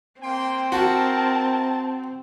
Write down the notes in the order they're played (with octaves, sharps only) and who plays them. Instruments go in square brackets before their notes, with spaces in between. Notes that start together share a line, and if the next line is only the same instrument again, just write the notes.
[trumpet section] A#3 G5 C6 [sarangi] C4
[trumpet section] E4 A#4 [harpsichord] F#4 [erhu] A5